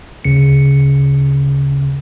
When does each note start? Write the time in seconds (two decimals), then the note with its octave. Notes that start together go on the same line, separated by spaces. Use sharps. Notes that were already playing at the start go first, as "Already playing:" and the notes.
0.25 D2 C#3 C#7